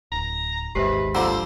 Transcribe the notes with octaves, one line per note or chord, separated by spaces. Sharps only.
D1 A#5
D#1 G#1 G#2 G4 B4 C5 E5
D3 F3 F4 C5 A#5 E6